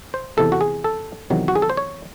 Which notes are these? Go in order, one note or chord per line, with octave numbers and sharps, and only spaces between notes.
C5
E2 C3 E3 A4
F#4
G#4
A4
E2 C3 D#3 F#3
F#4
G#4
A4
C5
C#5